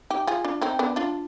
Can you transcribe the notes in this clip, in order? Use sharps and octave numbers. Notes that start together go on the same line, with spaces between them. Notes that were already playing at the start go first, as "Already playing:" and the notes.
D#4 G4
F4 G#4
D4 F4
C4 D#4
B3 D4
D4 F4